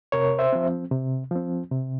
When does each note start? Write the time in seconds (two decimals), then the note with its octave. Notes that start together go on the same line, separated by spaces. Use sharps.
0.12 C3 A#4 C#5
0.39 C5 E5
0.53 F3 C4
0.91 C3
1.31 F3 C4
1.71 C3